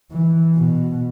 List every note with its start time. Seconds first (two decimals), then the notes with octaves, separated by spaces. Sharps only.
0.12 E3
0.55 B2